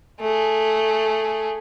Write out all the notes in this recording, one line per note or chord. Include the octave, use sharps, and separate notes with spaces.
A3 G#4